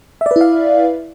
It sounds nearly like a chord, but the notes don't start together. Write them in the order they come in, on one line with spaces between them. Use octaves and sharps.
E5 D5 B4 E4 F5